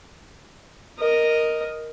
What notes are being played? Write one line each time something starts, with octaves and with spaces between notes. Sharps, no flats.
A#4 D#5